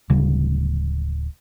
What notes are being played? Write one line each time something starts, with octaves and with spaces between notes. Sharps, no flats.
D1 C#3 G3